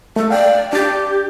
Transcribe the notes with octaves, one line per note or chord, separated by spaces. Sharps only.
A3 A4
D5 F5 G5
D4 G4 A6